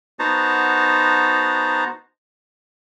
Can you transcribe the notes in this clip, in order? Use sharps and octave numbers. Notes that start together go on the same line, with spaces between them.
B3 D#4 F#4 C5 A5 A#5